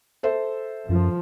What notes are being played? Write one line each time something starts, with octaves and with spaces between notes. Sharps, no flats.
A4 C5 E5
F#2 F3